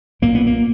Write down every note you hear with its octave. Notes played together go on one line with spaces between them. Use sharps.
B1 A#2 A#3
B3
A#3